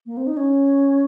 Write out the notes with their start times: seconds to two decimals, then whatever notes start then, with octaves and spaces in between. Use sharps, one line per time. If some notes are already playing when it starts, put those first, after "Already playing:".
0.06 A#3
0.17 C4
0.27 D#4
0.37 C#4